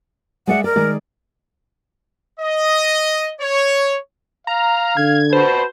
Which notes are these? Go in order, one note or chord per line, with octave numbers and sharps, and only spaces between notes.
G#3 D5 E5 F#5
A#4 D5
D#3 G#3 D5
D#5
C#5
F5 A#5
D3 G#6
F#4 B4 C5 A5